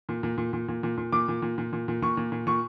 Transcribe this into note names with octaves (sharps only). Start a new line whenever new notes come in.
A#2
A#2
A#2
A#2
A#2
A#2
A#2
A#2 D6
A#2
A#2
A#2
A#2
A#2
A#2 C#6
A#2
A#2
A#2 C#6